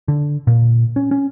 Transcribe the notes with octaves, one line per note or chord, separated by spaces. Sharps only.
D3
A#2
C#4
C#4